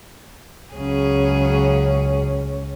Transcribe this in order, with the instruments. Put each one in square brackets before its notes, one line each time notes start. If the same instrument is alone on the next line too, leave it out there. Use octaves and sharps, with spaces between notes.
[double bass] C#2 C#4 [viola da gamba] C#3 F#3 G#4